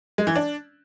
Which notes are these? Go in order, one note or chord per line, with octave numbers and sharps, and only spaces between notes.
G#3
E3
D4